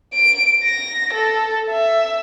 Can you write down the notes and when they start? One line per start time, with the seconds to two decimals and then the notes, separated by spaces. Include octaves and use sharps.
0.14 D7
0.63 A#6
1.13 A4
1.70 E5